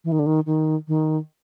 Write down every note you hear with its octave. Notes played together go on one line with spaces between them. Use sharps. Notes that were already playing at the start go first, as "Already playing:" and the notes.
E3
D#3
D3
D#3
D#3
D#3